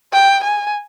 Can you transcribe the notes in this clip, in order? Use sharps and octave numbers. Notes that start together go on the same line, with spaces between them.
G5
G#5